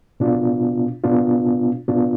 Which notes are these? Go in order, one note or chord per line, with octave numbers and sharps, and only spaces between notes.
B2 B3 D4 F4
B2 B3 D4 F4
B2 B3 D4 F4